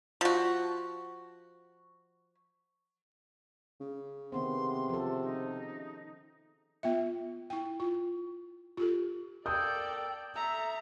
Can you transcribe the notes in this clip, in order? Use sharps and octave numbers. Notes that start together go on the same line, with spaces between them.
F3 F#4
C#3
C3 D#3 B3 C4 C6
F3 A4
D#4
B3 F4 E5
E4 G5
F4
F4 G4 A4
A#3 A4 D5 G5 D#6 G6
A3 A4 E5 A#5